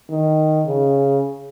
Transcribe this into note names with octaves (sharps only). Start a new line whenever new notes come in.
D#3
C#3